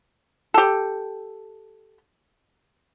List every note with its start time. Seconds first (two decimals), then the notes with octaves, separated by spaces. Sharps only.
0.54 G4 A4